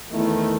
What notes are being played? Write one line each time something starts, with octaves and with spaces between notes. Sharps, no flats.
E2 D#3 A3 E4